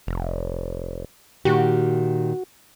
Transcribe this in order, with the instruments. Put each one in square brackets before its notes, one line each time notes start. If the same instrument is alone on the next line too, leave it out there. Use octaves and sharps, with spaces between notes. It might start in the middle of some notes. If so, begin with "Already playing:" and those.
[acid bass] F1
[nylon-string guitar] A#2 D#3 G4 [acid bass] F#4